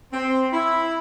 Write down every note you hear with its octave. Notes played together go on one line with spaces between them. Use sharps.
C4
E4